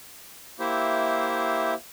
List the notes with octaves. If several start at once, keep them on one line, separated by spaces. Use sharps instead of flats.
A#3 E4 G4 C5 E5